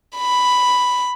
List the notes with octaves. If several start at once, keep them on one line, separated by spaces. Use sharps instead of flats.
B5